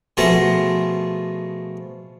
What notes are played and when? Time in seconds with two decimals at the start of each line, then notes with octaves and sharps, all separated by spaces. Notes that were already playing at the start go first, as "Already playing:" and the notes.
0.17 B2 F3 A3 G#4 A#5